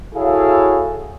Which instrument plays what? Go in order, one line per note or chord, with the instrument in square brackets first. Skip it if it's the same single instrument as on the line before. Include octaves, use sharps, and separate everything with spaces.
[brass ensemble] E4 F#4 G#4 A4 C#5 F5